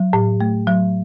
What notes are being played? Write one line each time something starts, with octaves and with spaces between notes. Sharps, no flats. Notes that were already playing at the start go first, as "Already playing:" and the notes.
Already playing: F#3
A2
A3
F#3